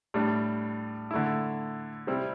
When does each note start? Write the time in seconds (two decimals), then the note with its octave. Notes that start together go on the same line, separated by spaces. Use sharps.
0.14 A2 G3 D4
1.11 D3 A3 E4
2.07 C3 G3 C4 E4